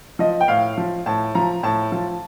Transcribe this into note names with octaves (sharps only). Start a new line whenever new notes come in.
F3 D#5
G5
A2 F5
F3
A2 A5
F3 A#5
A2 A5
F3